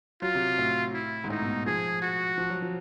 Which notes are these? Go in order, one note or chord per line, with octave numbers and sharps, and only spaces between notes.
F#3 F4
C3
A2
E4
G#2
A2 D#4
B2
F3 G#4
F#4
F3
F#3
F3